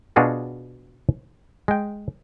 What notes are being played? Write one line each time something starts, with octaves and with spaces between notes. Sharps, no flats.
B2 D4 F4 F#4 G#4 A#4
G#3 G5